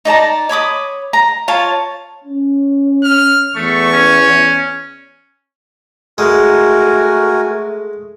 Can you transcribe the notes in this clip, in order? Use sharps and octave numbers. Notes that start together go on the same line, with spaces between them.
D#4 D5 A5 A#5
C#5 B5 D6 D#6
A#5
F4 C#5 F5 A5
C#4
F6
E2 A3 C#6
C#4
G#3 A3 F#4 A#4 G#5